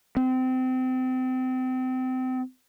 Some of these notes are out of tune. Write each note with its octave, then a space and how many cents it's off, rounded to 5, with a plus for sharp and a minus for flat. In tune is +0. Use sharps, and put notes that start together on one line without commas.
C4 -30